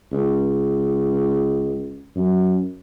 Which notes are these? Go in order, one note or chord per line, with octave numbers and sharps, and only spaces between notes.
C#2
F#2